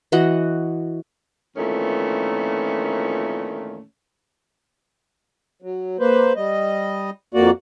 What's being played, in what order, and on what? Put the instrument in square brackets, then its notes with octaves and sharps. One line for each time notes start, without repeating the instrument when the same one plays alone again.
[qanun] E3 F#4 D#5 F#5
[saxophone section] F2 A#2 D#3 E3 A3 C#4
[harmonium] F#3
A#3 B4 C5
G3 D#5
F2 A#3 F#4 D5